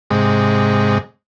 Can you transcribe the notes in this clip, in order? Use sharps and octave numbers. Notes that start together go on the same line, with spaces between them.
G#2 C3 G#3